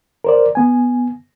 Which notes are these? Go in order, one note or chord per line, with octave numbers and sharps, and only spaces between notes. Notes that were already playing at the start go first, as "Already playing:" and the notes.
A#4 C5 D5
B3 G#5